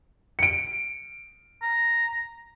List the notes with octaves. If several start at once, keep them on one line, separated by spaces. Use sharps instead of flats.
C#7 D7
A#5